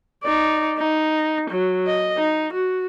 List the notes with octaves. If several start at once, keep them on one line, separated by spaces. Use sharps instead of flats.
D#4 D5
D#4
F#3
D#5
D#4
F#4